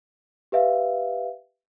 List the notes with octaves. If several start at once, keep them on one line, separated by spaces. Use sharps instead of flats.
G4 B4 E5 F5